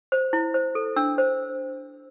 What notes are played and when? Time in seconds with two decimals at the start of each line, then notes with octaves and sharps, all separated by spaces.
0.12 C5
0.33 E4
0.54 C5
0.75 A4
0.96 D4 E6
1.18 C5